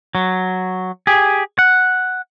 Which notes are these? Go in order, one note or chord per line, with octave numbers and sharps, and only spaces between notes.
F#3
G4 G#4
F#5